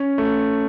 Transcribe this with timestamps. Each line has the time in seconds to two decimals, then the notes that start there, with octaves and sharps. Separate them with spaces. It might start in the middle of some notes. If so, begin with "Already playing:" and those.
Already playing: C#4
0.18 A3